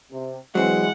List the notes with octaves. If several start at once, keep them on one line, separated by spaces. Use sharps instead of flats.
C3
E3 F#3 G#3 C4 F#5